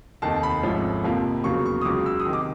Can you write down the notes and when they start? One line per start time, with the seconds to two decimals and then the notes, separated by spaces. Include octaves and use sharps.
0.22 F1 D#2 D#3 A5
0.43 B5
0.63 G#1 G#2 F3 A3 C#4
1.04 F2 C3 F3 A#3
1.44 E2 C#3 F#3 A#3 C#6
1.66 C#6
1.82 D#6
1.85 C#2 C#3 F#3 D6
2.06 E6
2.20 D#6
2.26 C3 D#3
2.33 D6